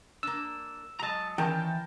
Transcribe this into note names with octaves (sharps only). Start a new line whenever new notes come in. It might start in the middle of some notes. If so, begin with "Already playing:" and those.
A#3 D4 E6
F#3 G#3 D#5 A5 A#5
D#3 E3 C#4 A#4 G5 A5